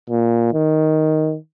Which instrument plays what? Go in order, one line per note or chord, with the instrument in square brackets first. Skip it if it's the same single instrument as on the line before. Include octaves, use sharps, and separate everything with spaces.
[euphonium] A#2
D#3